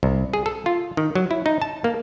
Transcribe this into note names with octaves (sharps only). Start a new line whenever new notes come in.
C2
G#4
A4
F4
D#3
F#3
E4
D#4
A5
A#3